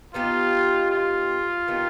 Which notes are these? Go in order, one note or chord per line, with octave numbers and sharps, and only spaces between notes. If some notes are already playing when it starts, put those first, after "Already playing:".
B3 D#4 F4 G4
F4
D#3 B3 D#4 G4